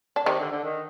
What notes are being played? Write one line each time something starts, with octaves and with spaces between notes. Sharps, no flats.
D4
C3 D#3 D#4
D3
D3
D#3